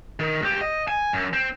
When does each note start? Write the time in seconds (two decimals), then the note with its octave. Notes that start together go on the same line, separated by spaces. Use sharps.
0.20 D#3
0.42 C#2 G4
0.61 D#5
0.88 G#5
1.13 F#2
1.33 C4